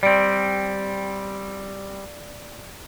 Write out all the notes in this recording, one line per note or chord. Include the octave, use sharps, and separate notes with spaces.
G3 C4 D5 D7